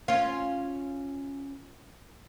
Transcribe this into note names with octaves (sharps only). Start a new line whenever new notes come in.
C#4 F4